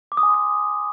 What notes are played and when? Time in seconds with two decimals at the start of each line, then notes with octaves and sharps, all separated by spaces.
0.12 D6
0.17 D#6
0.23 G#5
0.29 C6
0.34 D#6